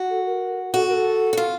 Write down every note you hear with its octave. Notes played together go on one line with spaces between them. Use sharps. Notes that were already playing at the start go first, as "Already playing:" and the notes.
Already playing: F#4
A4
A#4
F#4 A4
A#4
A4
F#4
F4